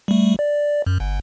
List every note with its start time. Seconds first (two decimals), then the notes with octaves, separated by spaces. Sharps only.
0.08 G3 A3
0.39 D5
0.86 F#2
1.00 G1